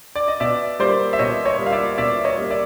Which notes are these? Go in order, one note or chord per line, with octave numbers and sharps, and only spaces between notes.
D5
D#5
B2 D5 E5
G3 A#3 C5 D5
E5
B2 C#5 D#5
C#5 D#5
G3 A#3
F5
D5 E5
B2 D5 E5
C#5 D#5
G3 A#3
D5 E5